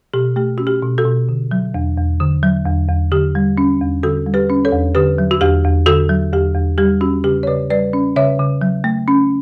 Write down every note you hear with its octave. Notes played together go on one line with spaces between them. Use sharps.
B2 G4
A3 G4
C#4 F#4
G4
B2
F#4 A4
B2
D3
F#3
E2
E2
D3
F#3
E2
E2
D3 G4
G3
C#4
E2
D3 F#4 A4
G3
G4 B4
C#4
A4 C#5
E2
D3 G4 B4
F#3
F#4
E2 G4
E2
D3 F#4 A4
F#3
E2 G4
E2
G3 G4
C#4 F#4
C#3 G4
C#5
C#3 B4 D5
G3 B4 D5
C#4
C#3 C#5 E5
C#3
F#3
A3
C#4